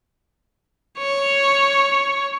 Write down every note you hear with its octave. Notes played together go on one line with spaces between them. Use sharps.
C#5